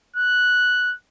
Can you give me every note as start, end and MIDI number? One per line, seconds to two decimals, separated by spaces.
0.16 0.94 90